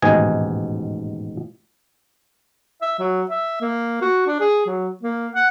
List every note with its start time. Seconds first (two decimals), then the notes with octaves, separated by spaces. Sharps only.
0.02 A1 D#2 G#2 B2 D#5 G#5
2.82 E5
2.99 F#3
3.30 E5
3.61 A#3
4.01 F#4
4.27 D4
4.40 G#4
4.66 F#3
5.03 A#3
5.35 F#5